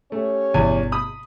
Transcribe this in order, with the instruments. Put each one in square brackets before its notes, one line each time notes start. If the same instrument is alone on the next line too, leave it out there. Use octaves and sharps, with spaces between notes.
[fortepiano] A3 [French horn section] C#4 G4 C#5
[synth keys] G1 B2 [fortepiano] E2 G#5
[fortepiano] B5 D#6